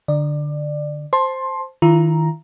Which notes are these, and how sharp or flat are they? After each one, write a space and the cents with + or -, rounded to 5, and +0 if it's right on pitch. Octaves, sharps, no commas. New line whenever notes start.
D3 +5 D5 +20
C5 +0 A5 -5 C6 +15
D#3 +20 F4 -40 A#5 +5